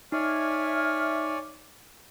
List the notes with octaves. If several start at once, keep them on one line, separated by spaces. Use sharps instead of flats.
D#4 C#5 D5 E5 G#5 F6